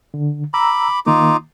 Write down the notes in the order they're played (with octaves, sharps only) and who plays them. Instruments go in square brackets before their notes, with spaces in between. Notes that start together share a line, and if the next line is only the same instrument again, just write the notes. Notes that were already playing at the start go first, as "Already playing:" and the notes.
[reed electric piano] D3
[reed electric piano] A#5 E6 [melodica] B5 D6
[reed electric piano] D#3 A#3 [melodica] D#4 F4 D6